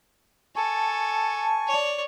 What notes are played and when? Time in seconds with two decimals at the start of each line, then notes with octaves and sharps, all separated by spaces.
0.56 A4 G#5 A5 C#6
1.67 C#5 D5